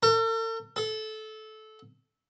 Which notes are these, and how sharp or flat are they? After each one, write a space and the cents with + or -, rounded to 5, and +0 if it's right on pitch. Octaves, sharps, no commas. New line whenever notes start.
A4 +45
A4 -20